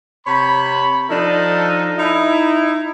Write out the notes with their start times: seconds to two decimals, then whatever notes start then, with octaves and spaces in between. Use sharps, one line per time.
0.26 C3 C#5 B5
1.09 F3 D4 D#4 A4
1.98 D#4 E4